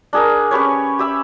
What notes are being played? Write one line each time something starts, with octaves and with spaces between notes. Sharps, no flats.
D4 G#4 A#4
C#4 G4 B4 C#5
G4 E5 B5